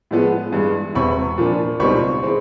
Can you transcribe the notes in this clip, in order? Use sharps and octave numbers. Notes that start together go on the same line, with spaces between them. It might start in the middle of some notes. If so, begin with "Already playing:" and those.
A2 F3 G#3 B3
G2 E3 G#3
E1 E2 C3 B5 C#6
A#2 F3 A#3 D4
C#2 B2 G3 C4 D#4 B5 C#6
E3 G#3 C4